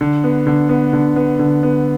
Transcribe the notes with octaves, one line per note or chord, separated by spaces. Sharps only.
D3
B3
D3
B3
D3
B3
D3
B3